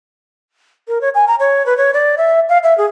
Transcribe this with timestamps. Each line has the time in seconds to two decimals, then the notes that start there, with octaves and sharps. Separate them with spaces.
0.88 A#4
1.01 C#5
1.15 G#5
1.28 A#5
1.40 C#5
1.66 B4
1.77 C#5
1.94 D5
2.18 E5
2.49 F5
2.64 E5
2.78 G#4